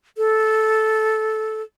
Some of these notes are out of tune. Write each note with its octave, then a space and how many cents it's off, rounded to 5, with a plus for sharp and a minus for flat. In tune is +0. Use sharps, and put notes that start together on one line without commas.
A4 -10